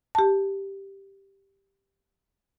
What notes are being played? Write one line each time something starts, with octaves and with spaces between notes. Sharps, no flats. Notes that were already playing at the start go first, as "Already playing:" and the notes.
G4 A5